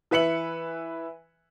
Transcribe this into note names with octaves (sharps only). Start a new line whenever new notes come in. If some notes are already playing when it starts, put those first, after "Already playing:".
E3 B4 E5 C#7 F#7